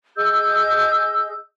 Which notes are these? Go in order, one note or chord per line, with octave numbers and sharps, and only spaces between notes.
G#4 D#5 E6 G6